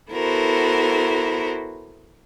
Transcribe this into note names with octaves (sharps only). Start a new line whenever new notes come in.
B3 E4 F#4 A4 A#4 C5